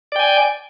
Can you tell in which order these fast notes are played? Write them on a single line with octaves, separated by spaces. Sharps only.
D5 G5 G#5